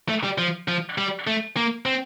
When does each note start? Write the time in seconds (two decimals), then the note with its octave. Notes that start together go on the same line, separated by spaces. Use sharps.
0.09 A3
0.24 G3
0.38 F3
0.68 F3
0.98 G3
1.27 A3
1.57 A#3
1.86 C4